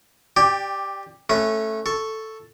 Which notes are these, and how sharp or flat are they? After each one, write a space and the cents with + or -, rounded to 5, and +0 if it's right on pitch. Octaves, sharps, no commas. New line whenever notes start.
G4 +0 D5 +5 G5 +25
A3 +0 C#4 -20 B4 +0
A4 +0 C#6 +0